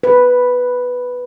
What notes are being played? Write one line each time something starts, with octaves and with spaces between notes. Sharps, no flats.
B4